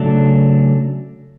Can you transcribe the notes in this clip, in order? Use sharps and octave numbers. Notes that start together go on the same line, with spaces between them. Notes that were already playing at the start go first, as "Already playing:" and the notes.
Already playing: C#3 F#3 A3 D4 A4